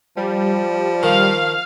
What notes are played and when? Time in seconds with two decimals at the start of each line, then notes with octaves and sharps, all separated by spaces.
0.17 F3 G3
1.03 D#3 F5